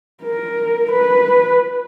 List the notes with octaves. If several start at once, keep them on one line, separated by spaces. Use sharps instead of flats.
A#4
B4